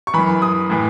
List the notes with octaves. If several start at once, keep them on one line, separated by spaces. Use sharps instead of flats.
C#6
F#2 E3 B5
D#6
A2 E3